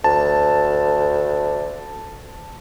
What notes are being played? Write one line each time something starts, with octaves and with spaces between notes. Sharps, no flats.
D2 A5